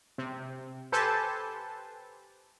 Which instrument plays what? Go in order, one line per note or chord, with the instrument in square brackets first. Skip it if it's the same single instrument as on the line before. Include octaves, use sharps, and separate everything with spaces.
[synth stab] C3
G4 A4 B4 C5 G#5 A5